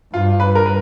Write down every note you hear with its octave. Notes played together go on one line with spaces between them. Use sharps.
G2 F4
B4
A#4
B4